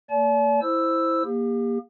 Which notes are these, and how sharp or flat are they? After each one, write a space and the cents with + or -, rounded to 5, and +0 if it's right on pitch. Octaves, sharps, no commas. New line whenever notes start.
A#3 -35 D5 -40 A5 -45
E4 +0 C5 +0 E6 +0
A#3 +15 G4 +40